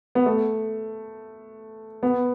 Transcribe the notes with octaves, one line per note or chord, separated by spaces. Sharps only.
B3
A3
B3